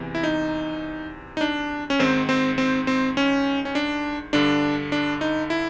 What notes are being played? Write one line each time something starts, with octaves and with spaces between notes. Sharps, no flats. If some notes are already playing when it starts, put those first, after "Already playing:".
Already playing: E2 C3 E3
E4
D#4
D#4
D4
C#4
G#2 D#3 C4
C4
C4
C4
C#4
C#4
D4
G2 D3 D4
D4
D#4
E4